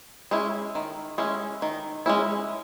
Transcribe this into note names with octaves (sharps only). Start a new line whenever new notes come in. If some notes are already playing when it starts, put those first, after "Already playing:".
G#3 C#4 E4
D#3
G#3 C#4 E4
D#3
G#3 C#4 E4